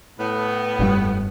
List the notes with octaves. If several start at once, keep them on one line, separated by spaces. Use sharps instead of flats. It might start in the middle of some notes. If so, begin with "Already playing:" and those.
A2 B3
F1 G2 G3